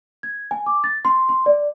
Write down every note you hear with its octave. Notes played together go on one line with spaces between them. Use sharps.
G#6
G#5
D6
A6
C6
C6
D5